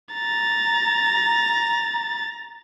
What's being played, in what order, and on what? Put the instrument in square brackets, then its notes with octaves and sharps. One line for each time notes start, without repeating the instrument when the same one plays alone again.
[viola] A#5 [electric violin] A6